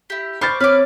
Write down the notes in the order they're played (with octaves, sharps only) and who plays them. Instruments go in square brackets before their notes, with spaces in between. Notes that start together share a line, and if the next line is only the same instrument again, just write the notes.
[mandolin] E4 G4
[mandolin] C5 C#6 D6 [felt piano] B5 F6 A6
[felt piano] C4 [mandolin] B4 D6 [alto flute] C#5 [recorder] F6